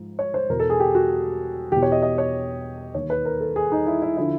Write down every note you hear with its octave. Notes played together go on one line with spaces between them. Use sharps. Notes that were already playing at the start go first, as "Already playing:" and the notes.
Already playing: G#2 F3
C#5
C5
E2 B2 A#4
A4
G#4
G4
F#4
E2 B2 G4
C#5
D#5
D#5
C#5
D#2 D#3 C#5
B4
A#4
A4
G#4
D#4
E4
E4
D3 F3 E4